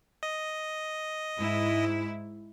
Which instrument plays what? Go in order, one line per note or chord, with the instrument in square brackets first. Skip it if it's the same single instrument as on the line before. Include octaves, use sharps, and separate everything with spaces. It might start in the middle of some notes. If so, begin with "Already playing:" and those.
[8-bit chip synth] D#5
[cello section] G#2 E4